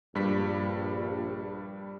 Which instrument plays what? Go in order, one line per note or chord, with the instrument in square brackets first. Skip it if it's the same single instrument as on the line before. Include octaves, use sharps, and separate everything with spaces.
[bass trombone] A#1 [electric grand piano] G2 G3 B6